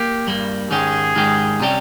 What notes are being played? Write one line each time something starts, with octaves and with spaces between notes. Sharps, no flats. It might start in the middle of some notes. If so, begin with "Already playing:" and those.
Already playing: A#3 G4
G2 G3 A#3
G#2 D#3 G#3 C#4 G4 G#4
G#2 D#3 G#3 C#4 G4
C3 G3 C#4 G4